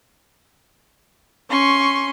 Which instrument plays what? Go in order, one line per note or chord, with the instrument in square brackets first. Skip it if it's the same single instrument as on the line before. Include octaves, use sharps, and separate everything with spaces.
[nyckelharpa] C#4 [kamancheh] C6 C#6